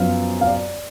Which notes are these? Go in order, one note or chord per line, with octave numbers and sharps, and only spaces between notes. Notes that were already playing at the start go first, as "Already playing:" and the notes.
Already playing: F#2 F3 B3 F5
F5
D5